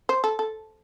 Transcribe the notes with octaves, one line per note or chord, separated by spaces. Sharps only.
C5
A4
A4